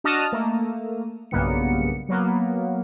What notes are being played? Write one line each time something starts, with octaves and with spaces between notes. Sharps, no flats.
D4 F#4 D#5 A5 D#6 F6
A3 A#3
B1 G2 C#3 A#3 B3 C#7
F#3 A#3 B3